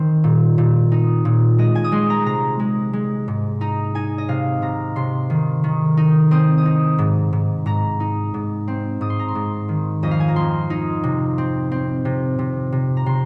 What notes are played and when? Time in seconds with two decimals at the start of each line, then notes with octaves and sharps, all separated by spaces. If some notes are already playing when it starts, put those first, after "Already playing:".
Already playing: D#3 C4 D#4
0.24 A#2
0.58 A#2
0.92 D#4
1.25 A#2
1.58 G#3 D#5
1.75 G#5
1.84 D#6
1.92 G#3 C6
2.10 A#5
2.26 C3 A#5
2.60 G#3
2.93 G#3
3.28 G#2
3.61 D#4 A#5
3.95 D#4 G#5
4.18 D#5
4.28 C3 F5
4.62 C3 A#5
4.96 C3 C6
5.30 D#3
5.64 D#3
5.97 D#4
6.31 C4 D#6
6.58 D#6
6.65 D#4
6.99 G#2
7.33 G#2
7.66 G#2 A#5
8.00 D#4
8.34 G#2
8.68 C4
9.01 G#2 D#6
9.10 C6
9.19 A#5
9.28 C6
9.35 G#2
9.69 D#3
10.03 F2 D#5
10.11 F5
10.20 G#5
10.28 A#5
10.36 F2 C6
10.70 D#4
11.04 C3
11.38 C4
11.72 C4
12.05 C3
12.39 C3
12.72 C3
12.97 A#5
13.06 C3 C6